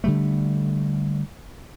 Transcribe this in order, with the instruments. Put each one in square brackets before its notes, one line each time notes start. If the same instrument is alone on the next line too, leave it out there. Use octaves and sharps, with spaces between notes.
[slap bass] D3 G3 A3